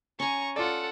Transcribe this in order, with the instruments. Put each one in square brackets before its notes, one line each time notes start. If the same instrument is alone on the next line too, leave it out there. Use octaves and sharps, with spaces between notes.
[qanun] C#4 G#5 [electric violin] A#5 C#6
[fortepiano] F4 D5 [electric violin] A4 F#5